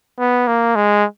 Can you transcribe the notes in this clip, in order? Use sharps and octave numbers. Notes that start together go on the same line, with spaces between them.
B3
A#3
G#3